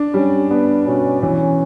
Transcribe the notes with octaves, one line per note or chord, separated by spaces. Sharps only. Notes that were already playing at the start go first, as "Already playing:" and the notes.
Already playing: D4
G3 C#4
B3 D4
B2 C#4
E3 C#4